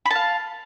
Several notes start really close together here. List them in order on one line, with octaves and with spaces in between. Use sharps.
B5 A5 F5